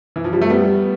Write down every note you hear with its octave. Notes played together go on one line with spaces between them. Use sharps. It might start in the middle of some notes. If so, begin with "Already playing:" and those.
E3
F3
G3
A3
G3 B3